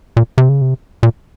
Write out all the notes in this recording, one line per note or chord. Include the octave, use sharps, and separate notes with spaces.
A#2
C3
C#3
C3
A#2